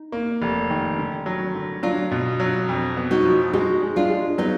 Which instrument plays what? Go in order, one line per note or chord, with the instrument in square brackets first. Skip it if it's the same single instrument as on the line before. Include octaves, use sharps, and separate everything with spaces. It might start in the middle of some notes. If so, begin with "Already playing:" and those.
Already playing: [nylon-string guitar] D#4
[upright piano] A#3
F1
D#3
D3
F#3
D3
[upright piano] F#3 [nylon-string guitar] D4 F4
[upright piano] B2
F#3
F2
B3
[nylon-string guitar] D#4 F#4
[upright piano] F3
[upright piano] G#3 [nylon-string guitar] D#4 F#4
[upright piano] G#3
[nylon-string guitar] D4 F4
[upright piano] G#3
[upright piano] F#3 [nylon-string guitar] B3 D#4